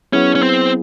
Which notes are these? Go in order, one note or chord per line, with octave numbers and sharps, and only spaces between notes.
F#3 B3 C#4 E4 G#4
C#4
C4